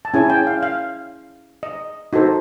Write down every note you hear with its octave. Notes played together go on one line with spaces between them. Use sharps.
A5
C#4 E4 G#4 C#5 G#5
G5
F5
F5
D#5
D#4 F#4 A4 C5